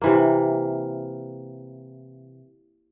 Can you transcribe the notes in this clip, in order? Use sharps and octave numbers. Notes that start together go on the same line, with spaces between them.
C3 E3 A#3